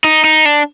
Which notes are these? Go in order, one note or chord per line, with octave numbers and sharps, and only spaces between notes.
D#4
D#4
D4